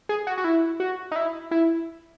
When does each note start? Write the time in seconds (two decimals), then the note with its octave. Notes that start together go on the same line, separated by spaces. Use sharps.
0.09 G#4
0.27 F#4
0.38 F#4
0.44 E4
0.80 F#4
1.12 D#4
1.16 E4
1.51 E4